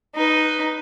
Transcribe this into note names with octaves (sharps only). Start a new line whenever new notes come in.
D#4 B4